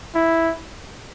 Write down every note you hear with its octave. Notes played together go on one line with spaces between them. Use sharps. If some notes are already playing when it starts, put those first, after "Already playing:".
E4